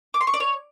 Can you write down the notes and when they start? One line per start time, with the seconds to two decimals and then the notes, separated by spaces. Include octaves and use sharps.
0.14 D6
0.21 C6
0.27 C#6
0.34 D5
0.40 C#5